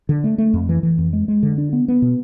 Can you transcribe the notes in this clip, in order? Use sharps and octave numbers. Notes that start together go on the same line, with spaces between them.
D3
A3
A3
F2
E3
E3
F2
G#3
G#3
D3
D4
B3
B3
B2